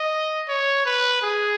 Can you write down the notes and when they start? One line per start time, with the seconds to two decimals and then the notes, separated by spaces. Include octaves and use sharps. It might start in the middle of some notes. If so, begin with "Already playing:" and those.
Already playing: D#5
0.48 C#5
0.85 B4
1.22 G#4